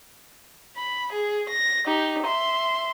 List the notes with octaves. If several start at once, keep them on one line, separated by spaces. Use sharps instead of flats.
B5
G#4
A#6
D#4 G4
E5 C6